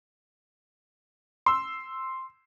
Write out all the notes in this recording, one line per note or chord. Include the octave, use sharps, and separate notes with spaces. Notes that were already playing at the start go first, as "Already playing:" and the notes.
C6 E6